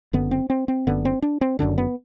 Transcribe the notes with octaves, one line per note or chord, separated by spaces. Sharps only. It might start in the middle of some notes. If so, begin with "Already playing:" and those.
F#1 F#2 D3 B3
C4
C4
C4
F#1 F#2 D3 B3
C4
D4
C4
F#1 F#2 D3 D4
B3